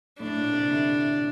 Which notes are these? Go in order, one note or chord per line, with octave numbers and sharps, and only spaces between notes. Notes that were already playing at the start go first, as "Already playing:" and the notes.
A2 D4
A#2
C3
D3